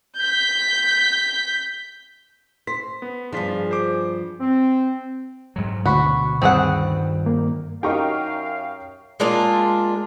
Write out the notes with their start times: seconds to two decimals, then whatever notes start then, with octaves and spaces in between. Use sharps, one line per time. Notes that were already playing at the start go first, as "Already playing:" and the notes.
0.18 G6 B6
2.67 C5 B6
3.02 B3
3.32 G2 F3 D4 F4 G#4 B6
3.71 C5 D6
4.40 C4
5.56 G#2 F#3
5.86 D2 B2 F#4 B5 C#6
6.42 G2 D#3 G3 C4 G#4 F#5
7.26 A#3
7.83 F#2 D#4 G4 F5 G5 A#5 C#6
9.20 G#3 A#3 D4 F4